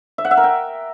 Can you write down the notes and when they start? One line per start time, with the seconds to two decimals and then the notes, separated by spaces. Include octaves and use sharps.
0.18 E5
0.25 F#5
0.31 E5
0.37 A#4
0.44 G5